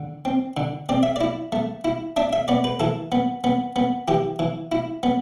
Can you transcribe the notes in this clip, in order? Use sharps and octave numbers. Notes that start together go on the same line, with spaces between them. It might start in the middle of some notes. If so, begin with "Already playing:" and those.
Already playing: D3
C4
D3
C4 D5
E5
E4 D5
A3
E4
D4 E5
E5
B3 D5
B4
E3 A4
B3
B3
B3
E3 G4
E3
E4
B3